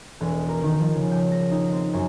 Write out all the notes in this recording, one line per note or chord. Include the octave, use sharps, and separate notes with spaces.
E1
A#4
D#3
F3
C#3
G5
A#6
D#4
C4
F#2